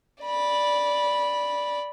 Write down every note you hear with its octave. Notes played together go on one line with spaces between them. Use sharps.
D5 B5